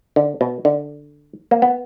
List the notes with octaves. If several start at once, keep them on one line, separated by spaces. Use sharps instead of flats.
D3
B2
D3
A#3
B3